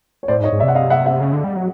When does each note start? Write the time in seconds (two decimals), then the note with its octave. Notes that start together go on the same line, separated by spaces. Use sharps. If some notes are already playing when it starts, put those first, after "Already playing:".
0.23 C#5
0.28 A2 C5 D5
0.41 G#2
0.44 C#5 D#5
0.52 G#2
0.59 D5 E5
0.63 C3
0.68 F#5
0.75 D#5 F5
0.90 E5 F#5
1.06 E5 F#5
1.21 C#3
1.33 D3
1.44 G3
1.56 F#3